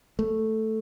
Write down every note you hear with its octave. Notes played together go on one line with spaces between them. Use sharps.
A3